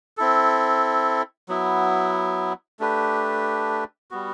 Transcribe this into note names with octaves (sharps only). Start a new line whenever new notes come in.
C4 E4 A4
F#3 B3 E4
A3 D4 G4 B4
G3 B3 F#4